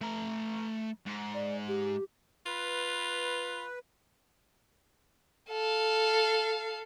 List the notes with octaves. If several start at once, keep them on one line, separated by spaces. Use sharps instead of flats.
A3 A#5
G#2
D5
G4
F4 B4
A4 F5